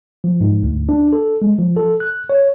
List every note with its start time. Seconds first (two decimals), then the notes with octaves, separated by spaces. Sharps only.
0.24 F3
0.41 G#2
0.63 D2
0.89 D4
1.13 A4
1.42 G#3
1.59 F3
1.76 A4
2.00 F#6
2.30 C#5